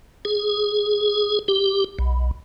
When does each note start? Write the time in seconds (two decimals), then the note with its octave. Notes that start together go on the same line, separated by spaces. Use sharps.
0.25 G#4
1.48 G4
1.99 B1